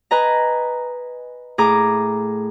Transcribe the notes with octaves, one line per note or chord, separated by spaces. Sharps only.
B4 D#5 G#5 A#5
A2 G#4 A#5 D6